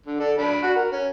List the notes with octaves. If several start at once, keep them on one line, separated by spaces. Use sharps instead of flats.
D3
A4 D5
D4 B5
F#4
A#4
C#4